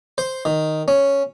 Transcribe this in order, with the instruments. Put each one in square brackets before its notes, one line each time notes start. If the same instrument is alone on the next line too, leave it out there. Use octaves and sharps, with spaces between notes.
[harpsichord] C5
D#3
C#4